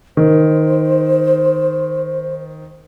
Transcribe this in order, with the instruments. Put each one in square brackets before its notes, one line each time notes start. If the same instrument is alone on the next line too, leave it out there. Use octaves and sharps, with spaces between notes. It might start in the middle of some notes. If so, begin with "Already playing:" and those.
[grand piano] D#3 [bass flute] C5